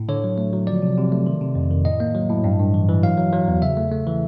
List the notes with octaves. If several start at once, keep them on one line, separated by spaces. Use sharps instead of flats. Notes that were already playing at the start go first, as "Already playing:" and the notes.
Already playing: A2
D3 C#5
F#3
A3
F#3
F3 D5
C3
C3
A3
D#3
C3
F2
D#3
A2 D#5
A#3
F#3
A2
G2
G2
E3
E3
F#3 F5
F#3
F#3
E2
C#3 E5
A3
A3
E3